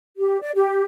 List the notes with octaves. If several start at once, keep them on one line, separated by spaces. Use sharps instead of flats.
G4
D5
G4